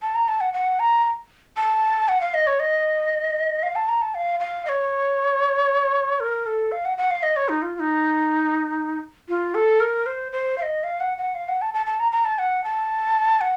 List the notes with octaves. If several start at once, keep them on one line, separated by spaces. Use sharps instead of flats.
A5
A#5
A5
F#5
F#5
A#5
A5
F#5
F5
D#5
C#5
D#5
F5
A5
A#5
A5
F5
F5
D#5
C#5
A#4
A4
F5
F#5
F#5
F5
D#5
C#5
D#4
F4
F4
D#4
F4
A4
A#4
C5
C5
F5
D#5
F5
F#5
F#5
F5
F#5
A5
A5
A5
A#5
A#5
A5
F#5
A5
F#5